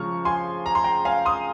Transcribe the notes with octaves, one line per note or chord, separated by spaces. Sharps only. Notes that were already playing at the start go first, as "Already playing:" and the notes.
Already playing: C#3 F3 G#3 A#5 C#6 F6
G#5 C6
A#5
C6
G5 A#5
F5 G#5
C6 D#6